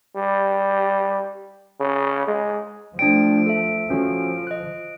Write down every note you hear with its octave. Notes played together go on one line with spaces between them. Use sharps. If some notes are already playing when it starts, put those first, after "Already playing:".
G3
C#3
G#3
F3 A3 D4 D5 G5 D7
A4 E5
F3 C#4 F#4 A4
D#5 F#6